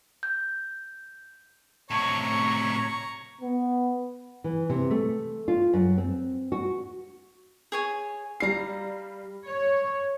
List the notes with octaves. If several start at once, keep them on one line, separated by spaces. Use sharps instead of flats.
G6
A2 C3 C#5 A#5 C#6
B3
E3
C3
A3
F4
F#2
C4
F#4
G#4 C#5 G#5
G3 F5 A#5 C7
C#5